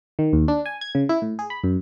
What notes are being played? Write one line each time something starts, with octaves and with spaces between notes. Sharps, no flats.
D#3
D#2
D4
G#5
G#6
C#3
E4
A2
G#4
B5
F#2